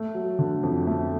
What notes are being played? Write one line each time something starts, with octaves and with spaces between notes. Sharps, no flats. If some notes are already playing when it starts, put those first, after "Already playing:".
Already playing: A3
F#3
D3
F2
A3